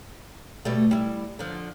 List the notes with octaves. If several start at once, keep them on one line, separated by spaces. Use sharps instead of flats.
B2 G3 A3
G3 E4
D3 F3